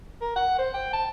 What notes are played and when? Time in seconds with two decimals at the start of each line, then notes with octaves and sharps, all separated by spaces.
0.21 A#4
0.36 F#5
0.58 C5
0.74 G5
0.93 A5